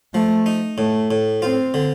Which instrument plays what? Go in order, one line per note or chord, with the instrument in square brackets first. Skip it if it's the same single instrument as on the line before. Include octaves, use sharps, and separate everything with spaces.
[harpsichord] F3 [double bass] A3
[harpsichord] D#4
[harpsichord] A2 [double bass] A3
[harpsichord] A2
[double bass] C4 [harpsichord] F4
[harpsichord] D3